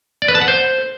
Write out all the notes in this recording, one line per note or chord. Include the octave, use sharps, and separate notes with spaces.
D5
B4
A5
F#5
C5